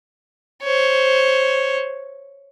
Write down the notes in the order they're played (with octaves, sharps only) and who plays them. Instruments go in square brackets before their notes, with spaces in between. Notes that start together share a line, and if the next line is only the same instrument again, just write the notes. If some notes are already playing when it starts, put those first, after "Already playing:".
[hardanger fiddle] C5 C#5